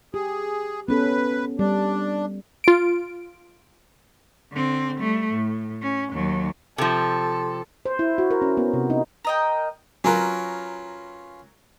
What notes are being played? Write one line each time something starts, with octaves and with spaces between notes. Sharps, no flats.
G4 G#4
B3 C#4 A4 B4
G3 D4
F4 D7
D3 C4
G3 A3
A2
C#4
D#2 F#3
C3 F3 A4
C5
E4
F#4
A#4
C#4
B3
C3
D#4
A#4 D#5 G5
F#3 C#4 F4 A#4 B4